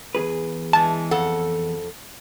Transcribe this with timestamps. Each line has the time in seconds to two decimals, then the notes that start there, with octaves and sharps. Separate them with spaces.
0.15 E2 G#4 B4
0.73 E3 G#3 A5
1.11 F2 A4 F#5